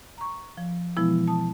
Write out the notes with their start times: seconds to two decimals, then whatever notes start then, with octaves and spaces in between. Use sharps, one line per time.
0.18 A#5 C#6
0.57 F3
0.97 B2 E3 F3 G#3 B3 E4
1.27 A5 D#6